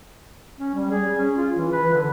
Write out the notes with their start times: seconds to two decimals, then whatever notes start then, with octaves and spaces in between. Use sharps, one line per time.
0.59 C#4
0.74 G3
0.91 G#4
1.17 C#4
1.36 F4
1.56 E3
1.72 B4
1.94 D3